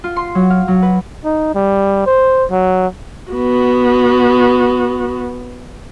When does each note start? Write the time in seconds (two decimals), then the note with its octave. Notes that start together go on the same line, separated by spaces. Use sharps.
0.04 F4
0.16 C6
0.35 F#3
0.50 F5
0.68 F#3
0.82 B4
1.25 D#4
1.55 G3
2.06 C5
2.51 F#3
3.32 B3 F#4